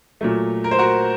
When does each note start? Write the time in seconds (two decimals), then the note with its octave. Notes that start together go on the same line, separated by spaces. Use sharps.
0.21 A#2 F#3 A3
0.64 A#4
0.71 C5
0.79 F#4 A#4